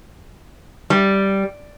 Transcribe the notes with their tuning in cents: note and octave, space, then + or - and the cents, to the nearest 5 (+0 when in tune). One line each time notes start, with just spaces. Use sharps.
G3 -5